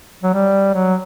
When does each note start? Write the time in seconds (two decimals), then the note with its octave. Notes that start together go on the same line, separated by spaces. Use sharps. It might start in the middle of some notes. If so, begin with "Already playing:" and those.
0.23 F#3
0.34 G3
0.74 F#3